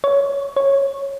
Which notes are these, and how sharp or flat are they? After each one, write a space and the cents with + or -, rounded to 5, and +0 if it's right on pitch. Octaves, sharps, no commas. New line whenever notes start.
C#5 +15
C#5 -10